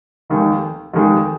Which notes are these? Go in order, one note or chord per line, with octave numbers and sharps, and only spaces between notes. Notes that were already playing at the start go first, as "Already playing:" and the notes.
F1 D#2 D#3 G#3
F1 D#2 D#3 G#3